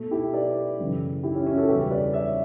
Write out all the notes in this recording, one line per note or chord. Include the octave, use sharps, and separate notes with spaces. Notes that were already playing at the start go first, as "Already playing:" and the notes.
Already playing: B2 A3
E4 G4
B4 D5
F#2 C#3 E3 A3
E4 G4
C#4 E4
C#4
F#4 A4
E2 C#3 G3 G4 B4
B4 D5
C#5 E5